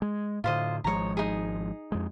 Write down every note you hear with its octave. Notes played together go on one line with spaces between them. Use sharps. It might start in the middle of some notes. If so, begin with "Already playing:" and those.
G#3
A2 D3 F4 C5 D#5
G#1 F3 G#3 C#5 A#5
D#4 G#4
F2 G#3